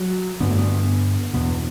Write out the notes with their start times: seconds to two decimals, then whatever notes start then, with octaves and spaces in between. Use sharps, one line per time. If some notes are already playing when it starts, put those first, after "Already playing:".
Already playing: F#3
0.40 G2 D3 B3
0.49 A3
0.59 B3
1.33 E2 B2 B3